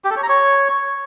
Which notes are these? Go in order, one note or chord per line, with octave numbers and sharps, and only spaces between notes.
G4
A4
C#5
A#5
C#5